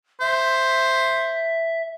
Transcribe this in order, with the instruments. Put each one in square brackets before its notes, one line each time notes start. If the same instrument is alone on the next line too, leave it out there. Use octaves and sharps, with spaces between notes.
[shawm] C5 [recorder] E5